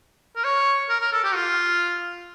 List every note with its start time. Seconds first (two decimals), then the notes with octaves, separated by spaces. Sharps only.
0.36 A#4
0.44 C#5
0.89 A#4
1.00 A#4
1.12 A4
1.24 G4
1.35 F4